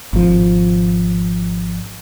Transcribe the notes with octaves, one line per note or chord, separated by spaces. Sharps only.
G#1 F3